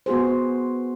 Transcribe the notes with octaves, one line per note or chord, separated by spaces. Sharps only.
B3 F#4 G#4 C5